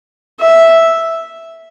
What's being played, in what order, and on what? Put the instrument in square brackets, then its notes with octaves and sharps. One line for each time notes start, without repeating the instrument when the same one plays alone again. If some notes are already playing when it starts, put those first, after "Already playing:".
[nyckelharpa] E5